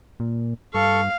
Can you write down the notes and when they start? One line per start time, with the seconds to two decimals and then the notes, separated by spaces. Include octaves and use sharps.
0.20 A#2
0.74 G2 A4 F5 C#6